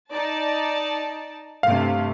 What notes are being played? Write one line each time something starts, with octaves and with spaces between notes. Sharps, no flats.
D#4 D5 A5
G2 C3 A3 F5